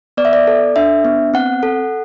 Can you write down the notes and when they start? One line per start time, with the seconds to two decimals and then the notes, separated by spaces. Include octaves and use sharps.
0.17 B3 D5
0.25 E5
0.33 D5
0.47 A4
0.76 D4 E5
1.05 B3
1.34 C4 F#5
1.63 A4